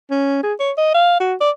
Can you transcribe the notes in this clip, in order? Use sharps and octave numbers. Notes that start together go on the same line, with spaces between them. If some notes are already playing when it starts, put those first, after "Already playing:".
C#4
G#4
C#5
D#5
F5
F#4
D5